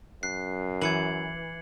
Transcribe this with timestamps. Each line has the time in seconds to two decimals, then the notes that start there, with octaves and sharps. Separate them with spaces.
0.23 F#2 F#6 C7
0.81 E3 G#6 C#7 F#7